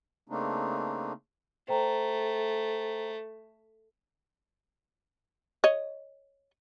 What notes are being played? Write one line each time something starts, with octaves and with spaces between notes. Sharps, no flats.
C#3 A3 A#3 C4 D4 D#4
A3 C5 G5 A#5
C#5 D#5